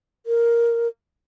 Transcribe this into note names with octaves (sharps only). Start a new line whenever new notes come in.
A#4